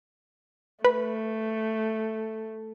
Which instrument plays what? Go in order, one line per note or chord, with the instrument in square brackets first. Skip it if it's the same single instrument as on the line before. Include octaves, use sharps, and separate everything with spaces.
[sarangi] A3 [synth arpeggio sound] B4